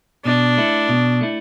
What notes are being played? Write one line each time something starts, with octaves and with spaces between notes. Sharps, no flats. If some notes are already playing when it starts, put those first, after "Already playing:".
B2 D4
A3 E4
B2
A3 E4